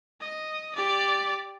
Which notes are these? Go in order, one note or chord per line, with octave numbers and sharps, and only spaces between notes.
D#5
G4 D5